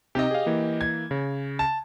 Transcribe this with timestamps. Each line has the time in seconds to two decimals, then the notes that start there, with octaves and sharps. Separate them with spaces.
0.15 C3 C4 D#4 G4 D#5
0.31 G#4 F5
0.46 E3 A#3
0.81 G#6
1.11 C#3
1.59 A5